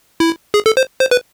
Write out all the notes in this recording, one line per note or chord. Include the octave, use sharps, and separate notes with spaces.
E4
G#4
A4
C5
C5
B4